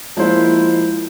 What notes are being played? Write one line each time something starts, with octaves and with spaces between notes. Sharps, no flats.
F3 G#3 A#3 E4 C5